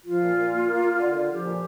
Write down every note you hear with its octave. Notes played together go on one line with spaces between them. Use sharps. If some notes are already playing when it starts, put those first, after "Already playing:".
F3 F4
A#2
A#2
A#3
A#3
A#3
D3
D3
F3 G4
A#2